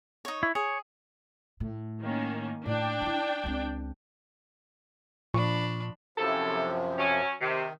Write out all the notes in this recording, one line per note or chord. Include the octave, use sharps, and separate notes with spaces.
D#4 C#5
E4
G#4 C#5
A2
D#3 A#3 C#4
A2 D4 G5
D#4 E4
C#2 C4
A#2 F3 D4 B5 C#6
F#2 C3 F3 F#3 E4 A4
F#3 C#4
C3 D#3